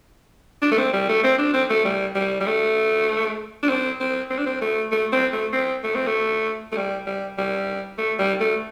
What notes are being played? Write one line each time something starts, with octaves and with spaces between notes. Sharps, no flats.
D4
A3
C4
G3
A3
C4
D4
C4
A3
G3
G3
G3
A3
D4
C4
C4
C4
D4
C4
A3
A3
C4
A3
C4
A3
C4
A3
A3
G3
G3
G3
A3
G3
A3